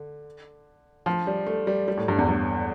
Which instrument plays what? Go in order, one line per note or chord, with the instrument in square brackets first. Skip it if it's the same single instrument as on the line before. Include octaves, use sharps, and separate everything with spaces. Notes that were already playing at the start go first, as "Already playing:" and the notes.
Already playing: [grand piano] D3
F3
G3
A3
G3
G3
A2
G2
E2
G2